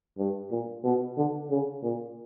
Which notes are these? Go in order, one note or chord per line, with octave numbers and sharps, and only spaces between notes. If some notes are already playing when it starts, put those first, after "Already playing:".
G2
A#2
B2
D3
C#3
A#2